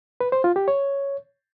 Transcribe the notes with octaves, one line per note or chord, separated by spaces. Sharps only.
B4
C5
F4
G4
C#5